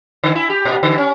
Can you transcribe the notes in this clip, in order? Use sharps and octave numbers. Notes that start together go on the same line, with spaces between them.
D3
E4
G4
A#2
D3
C#4